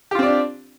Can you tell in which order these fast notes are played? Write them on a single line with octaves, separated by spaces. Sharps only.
G4 F4 C4 D5 D4